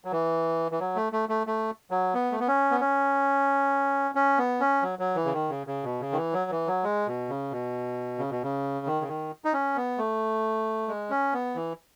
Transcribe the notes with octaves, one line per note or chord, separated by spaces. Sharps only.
F#3
E3
E3
F#3
A3
A3
A3
A3
F#3
B3
A3
B3
C#4
B3
C#4
C#4
B3
C#4
F#3
F#3
E3
C#3
D#3
C#3
C#3
B2
C#3
D#3
E3
F#3
E3
F#3
G#3
B2
C#3
B2
C#3
B2
C#3
D#3
C#3
D#3
D#4
C#4
B3
A3
G#3
C#4
B3
E3